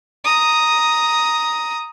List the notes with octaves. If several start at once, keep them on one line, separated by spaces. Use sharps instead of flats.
A#5 D#6